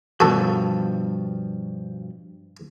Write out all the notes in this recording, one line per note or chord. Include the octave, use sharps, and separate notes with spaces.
G2 B2 F3 F#4 A4